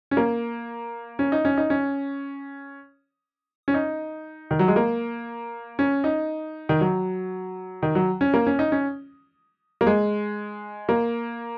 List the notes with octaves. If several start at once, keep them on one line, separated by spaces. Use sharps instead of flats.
C#4
A#3
C#4
D#4
C#4
D#4
C#4
C#4
D#4
D#3
F#3
G#3
A#3
C#4
D#4
D#3
F#3
D#3
F#3
C#4
A#3
C#4
D#4
C#4
A#3
G#3
A#3